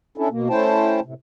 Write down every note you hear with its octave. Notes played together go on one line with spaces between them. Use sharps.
C#4 D4 E4 A4
B2 A#3
A3 C#4 E4 C5 G5 A5
A2 C3